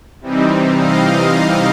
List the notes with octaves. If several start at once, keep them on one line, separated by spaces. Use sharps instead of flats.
C3 E3 G3 C4 D#4
D#5 F5
D#5 F5